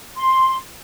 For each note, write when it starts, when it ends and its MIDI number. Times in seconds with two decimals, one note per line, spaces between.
0.18 0.57 84